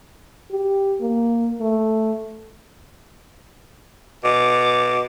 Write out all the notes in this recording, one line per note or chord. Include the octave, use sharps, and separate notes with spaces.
G4
A#3
A3
B2 D6